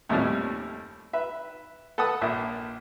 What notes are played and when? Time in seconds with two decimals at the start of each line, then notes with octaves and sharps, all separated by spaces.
0.09 D#2 A2 C3 F3 G3 C#4
1.13 B4 E5
1.98 A4 B4 F#5 A5 D#6
2.21 A#1 A#2 E5